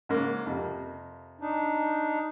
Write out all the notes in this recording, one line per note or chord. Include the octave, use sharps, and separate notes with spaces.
G#2 C#3 A#3
F2 C3
D4 D#4